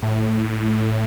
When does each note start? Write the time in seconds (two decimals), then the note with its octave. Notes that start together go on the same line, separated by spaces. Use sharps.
0.02 A2